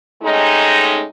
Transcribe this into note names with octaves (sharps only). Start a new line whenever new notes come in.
C3 G#3 A3 C#4 D#4